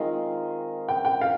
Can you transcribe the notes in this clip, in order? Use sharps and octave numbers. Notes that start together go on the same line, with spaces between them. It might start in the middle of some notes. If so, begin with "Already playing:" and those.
Already playing: D#3 G#3 C4 F4 D#5
G5
G5
F5